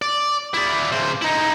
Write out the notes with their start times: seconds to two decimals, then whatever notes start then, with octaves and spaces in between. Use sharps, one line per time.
0.02 D5
0.54 E4 D5
0.92 C#3 C5
1.22 D#4 E4